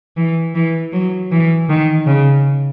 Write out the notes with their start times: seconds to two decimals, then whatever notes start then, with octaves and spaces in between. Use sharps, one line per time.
0.17 E3
0.55 E3
0.92 F#3
1.32 E3
1.69 D#3
2.07 C#3